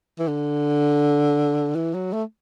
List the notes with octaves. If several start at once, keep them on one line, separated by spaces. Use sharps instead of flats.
E3
D3
E3
F#3
A3